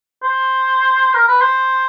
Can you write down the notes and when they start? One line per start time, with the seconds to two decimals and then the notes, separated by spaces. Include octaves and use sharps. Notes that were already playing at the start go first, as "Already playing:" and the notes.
0.23 C5
1.14 A#4
1.28 B4
1.41 C5